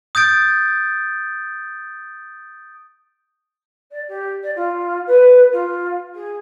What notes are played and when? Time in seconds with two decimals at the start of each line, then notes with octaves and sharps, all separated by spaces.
0.15 D#6 G6 A6 D7
3.91 D5
4.08 G4
4.43 D5
4.56 F4
5.07 B4
5.52 F4
6.15 G#4